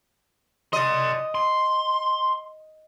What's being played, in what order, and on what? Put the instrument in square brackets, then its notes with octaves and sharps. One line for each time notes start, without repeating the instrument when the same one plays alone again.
[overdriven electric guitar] D5 C6 [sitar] D#5
[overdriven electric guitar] C6